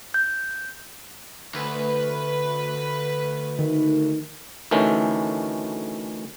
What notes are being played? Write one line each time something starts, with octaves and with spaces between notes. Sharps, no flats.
G6
D2 B4
D#3
D2 D#3 E3 A3 C#4